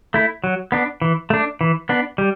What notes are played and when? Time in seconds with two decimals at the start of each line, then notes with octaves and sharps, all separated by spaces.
0.14 A3 E4
0.44 F#3
0.72 B3 D4
1.02 E3
1.30 A3 D4
1.61 E3
1.89 B3 D4
2.18 G3